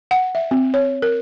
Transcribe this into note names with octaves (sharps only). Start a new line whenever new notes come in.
F#5
E5
C4
C#5
A#4